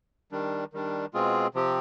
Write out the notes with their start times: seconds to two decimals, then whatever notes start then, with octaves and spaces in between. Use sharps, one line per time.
0.32 D#3 G3 D4
0.73 D#3 G3 D4
1.14 B2 G#3 C4 F4 G#4
1.54 C3 F3 C4 G4